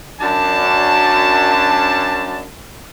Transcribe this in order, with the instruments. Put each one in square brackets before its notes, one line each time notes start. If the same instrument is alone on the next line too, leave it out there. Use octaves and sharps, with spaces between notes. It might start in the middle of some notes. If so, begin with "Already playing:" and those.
[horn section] F#2 D4 A5